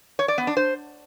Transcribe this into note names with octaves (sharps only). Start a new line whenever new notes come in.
C#5
D5
B3
D4
C5